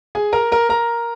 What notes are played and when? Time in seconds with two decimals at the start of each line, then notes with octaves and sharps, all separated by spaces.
0.15 G#4 G#5
0.33 A#4 A#5
0.52 A#4 A#5
0.69 A#4 A#5